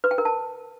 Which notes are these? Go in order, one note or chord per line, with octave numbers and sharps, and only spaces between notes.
B4
G5
A#4
A5